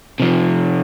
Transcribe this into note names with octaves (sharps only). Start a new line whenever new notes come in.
C3 F3